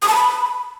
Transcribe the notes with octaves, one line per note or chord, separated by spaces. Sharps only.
D#6
A5
B5